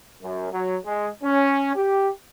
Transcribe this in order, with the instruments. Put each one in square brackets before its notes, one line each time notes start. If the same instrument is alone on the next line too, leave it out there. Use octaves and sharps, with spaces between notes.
[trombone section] F#2
F#3
G#3
C#4
G4